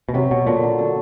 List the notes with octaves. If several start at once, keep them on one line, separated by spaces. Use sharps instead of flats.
B2
C3 F#3
B2 F#3
A#2 D3
F#3
D3